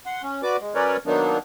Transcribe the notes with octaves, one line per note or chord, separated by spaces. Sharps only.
F#5 C6
C#4
F#4 B4 D5 D6
G#3
F#3 C#4 A#4 B4 C#5 D5
D#3 F#3 A#3 B3 D4 D#4